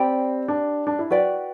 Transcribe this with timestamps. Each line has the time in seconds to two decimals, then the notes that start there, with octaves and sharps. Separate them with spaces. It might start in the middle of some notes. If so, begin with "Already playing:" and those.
Already playing: C4 G4 D5 G5 B5
0.48 D4
0.87 D4
0.99 E4
1.10 F#4 B4 D5 G5